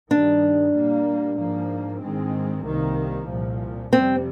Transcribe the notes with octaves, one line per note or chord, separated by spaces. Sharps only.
G2 D#3 G3 D4
A#2 G3 A#3
G#2 F3 A#3
G#2 D#3 G#3 C4
C2 C3 D#3 A#3
C2 A#2 F3
F2 C3 G3 C4